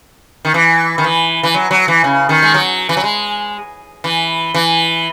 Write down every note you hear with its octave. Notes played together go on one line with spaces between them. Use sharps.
D#3
E3
D#3
E3
E3
F#3
F#3
E3
C#3
D#3
G#3
F#3
E3
F#3
G#3
E3
E3